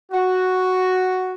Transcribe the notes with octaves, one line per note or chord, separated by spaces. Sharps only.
F#4